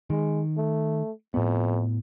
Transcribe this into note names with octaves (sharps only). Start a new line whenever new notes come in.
D#3 G#3
A3
F2 A2 B3